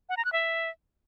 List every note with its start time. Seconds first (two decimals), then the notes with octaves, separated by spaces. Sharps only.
0.09 F#5
0.17 A#5
0.25 F#6
0.33 E5